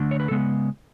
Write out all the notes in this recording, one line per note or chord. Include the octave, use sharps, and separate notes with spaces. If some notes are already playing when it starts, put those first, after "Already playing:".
Already playing: D3 A3 D4
C#5
B4
A4
C#3 G#3 B3